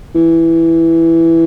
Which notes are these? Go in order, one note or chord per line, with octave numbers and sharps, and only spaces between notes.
E3